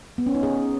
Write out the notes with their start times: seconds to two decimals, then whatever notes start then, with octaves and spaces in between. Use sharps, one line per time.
0.18 B3
0.26 C#4
0.35 D#4
0.43 G#4